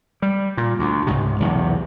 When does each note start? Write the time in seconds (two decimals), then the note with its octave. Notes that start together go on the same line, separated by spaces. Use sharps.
0.22 G3
0.57 A#2
0.79 D2
1.07 C#2 G#2 C3
1.40 B1 E2 C3